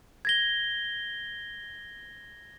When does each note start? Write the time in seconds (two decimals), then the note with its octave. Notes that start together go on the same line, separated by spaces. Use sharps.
0.25 G#6 A#6 G7